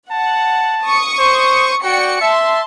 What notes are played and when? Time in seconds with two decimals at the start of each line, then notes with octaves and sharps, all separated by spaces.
0.11 F#5 A5
0.83 C#6 D#6
1.19 C5
1.84 F#4 D5 G5 C#7
2.21 E5 A5 C6